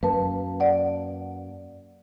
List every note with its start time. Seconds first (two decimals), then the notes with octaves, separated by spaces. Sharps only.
0.03 F#2 A#3 B4 A5
0.60 D5 F#5